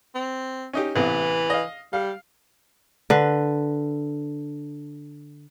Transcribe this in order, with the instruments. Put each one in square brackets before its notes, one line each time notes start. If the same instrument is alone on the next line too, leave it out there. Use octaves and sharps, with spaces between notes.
[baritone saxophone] C4
[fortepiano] C#4 D#4 G4
[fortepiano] A1 C3 B3 [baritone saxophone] E3
[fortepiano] D#5 F5
[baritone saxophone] G3 [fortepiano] F5
[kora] D3 B4